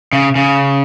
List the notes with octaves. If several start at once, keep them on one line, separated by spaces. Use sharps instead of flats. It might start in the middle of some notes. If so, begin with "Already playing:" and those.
C#3
C#3